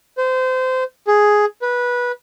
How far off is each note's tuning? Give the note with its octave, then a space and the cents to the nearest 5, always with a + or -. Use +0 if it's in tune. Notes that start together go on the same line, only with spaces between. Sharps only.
C5 -25
G#4 +5
B4 -15